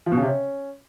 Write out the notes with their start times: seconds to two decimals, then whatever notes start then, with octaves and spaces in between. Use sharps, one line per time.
0.06 F3
0.12 B2
0.17 C#3
0.22 C3
0.28 C#4